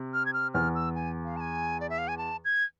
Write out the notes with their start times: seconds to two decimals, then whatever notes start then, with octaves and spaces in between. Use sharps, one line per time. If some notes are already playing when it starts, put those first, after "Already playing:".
Already playing: C3
0.14 F6
0.26 G#6
0.33 F6
0.54 E2 F6
0.75 E6
0.95 G#5
1.24 F5
1.37 A5
1.40 G#5
1.80 D5
1.90 E5
1.98 F5
2.08 G#5
2.17 A5
2.45 G#6